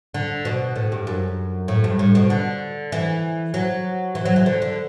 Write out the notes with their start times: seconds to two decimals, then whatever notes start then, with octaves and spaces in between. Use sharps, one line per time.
0.14 D3
0.45 B2
0.75 A2
0.92 G2
1.07 F#2
1.68 A2
1.84 G2
1.99 A2
2.15 B2
2.30 D3
2.92 E3
3.54 F#3
4.15 E3
4.25 F#3
4.36 E3
4.46 D3
4.62 D3